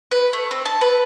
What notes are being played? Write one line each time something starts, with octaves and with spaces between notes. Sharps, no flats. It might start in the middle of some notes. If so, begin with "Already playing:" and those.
B4
A3
C4
A5
B4